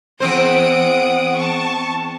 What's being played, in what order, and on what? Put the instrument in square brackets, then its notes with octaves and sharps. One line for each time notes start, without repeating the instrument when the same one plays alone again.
[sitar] E2 C4 C5 [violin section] F#5 D#6 D7
[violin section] A5 C#6